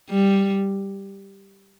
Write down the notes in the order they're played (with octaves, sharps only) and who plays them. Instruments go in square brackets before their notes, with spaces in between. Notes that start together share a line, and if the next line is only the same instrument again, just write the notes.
[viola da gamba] G3